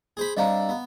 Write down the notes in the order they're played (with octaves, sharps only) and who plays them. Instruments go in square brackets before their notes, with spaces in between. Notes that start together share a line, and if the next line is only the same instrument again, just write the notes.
[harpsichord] G#4 C5 B5
[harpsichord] G3 C4 D4 [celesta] D#5 F5 A#5
[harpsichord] B3